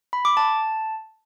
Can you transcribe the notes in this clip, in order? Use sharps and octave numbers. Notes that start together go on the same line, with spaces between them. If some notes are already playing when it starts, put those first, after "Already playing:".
B5
D6
A5